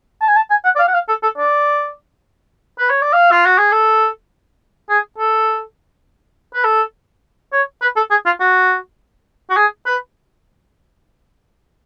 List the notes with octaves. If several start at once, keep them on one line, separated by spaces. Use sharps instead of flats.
A5
G#5
A5
G#5
F#5
D5
F5
F#5
F5
A4
A4
D5
B4
C#5
D5
F5
F4
F#4
G#4
A4
G#4
A4
B4
A4
C#5
B4
A4
G#4
F4
F#4
F#4
G#4
B4